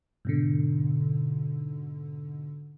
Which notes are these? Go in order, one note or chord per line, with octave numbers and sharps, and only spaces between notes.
G#2 B2 D3